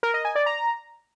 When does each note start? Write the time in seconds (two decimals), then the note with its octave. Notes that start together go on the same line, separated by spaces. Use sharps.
0.03 A#4
0.14 D#5
0.25 G#5
0.35 D5
0.46 A#5